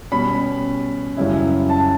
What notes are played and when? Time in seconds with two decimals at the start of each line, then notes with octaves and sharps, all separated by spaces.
0.12 B2 G3 C#4 B5
1.17 F#2 C#3 G3 C#4 E4
1.69 A5